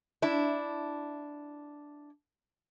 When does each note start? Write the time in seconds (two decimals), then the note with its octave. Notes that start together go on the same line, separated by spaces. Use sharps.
0.22 D4 E4